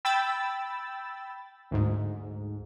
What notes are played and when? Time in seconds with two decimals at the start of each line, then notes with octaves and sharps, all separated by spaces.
0.05 G5 B5 E6 A6
1.71 D2 G#2